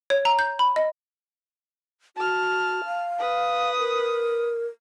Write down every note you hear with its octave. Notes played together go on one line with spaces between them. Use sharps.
C#5
A#5
G6
B5
D#5
F#4 A5 F6
F5
B4 D#6
A#4